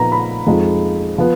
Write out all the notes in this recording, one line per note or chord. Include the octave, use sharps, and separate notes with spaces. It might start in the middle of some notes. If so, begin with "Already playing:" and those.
Already playing: A#2 F3 B3 D#4 A#5
B5
F2 F3 G#3 D#4
F3 B3